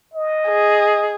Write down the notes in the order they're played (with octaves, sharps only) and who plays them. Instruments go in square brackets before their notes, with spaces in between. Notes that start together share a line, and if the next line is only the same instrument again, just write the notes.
[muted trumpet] D#5
[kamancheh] G#4